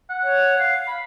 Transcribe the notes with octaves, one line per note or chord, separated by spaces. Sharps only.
F#5
C#5
F5
B5